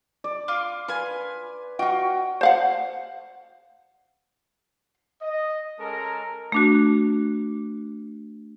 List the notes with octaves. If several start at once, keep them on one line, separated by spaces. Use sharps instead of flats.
D5
F4 C6 D6
F4 B4 G#5
F4 F#4 D#5 G5 C#6
C5 F5 F#5
D#5
G#3 C#4 A4 A#4 A#5
A3 D4 F#4